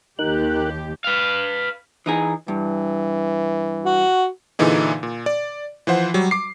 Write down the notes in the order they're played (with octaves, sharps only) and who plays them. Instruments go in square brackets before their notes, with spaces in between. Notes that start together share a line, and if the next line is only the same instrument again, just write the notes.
[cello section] D#2 G4 [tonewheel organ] D#4 A#4 F#6
[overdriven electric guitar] B4 F5
[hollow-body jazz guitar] E3 D#4 G#4
[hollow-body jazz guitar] G2 [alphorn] E3
[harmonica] F#4
[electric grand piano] A#2 D3 E3 D#4 G#4
A#2
D5
E3 F3 C5 F#5
F#3 G3
D6 C7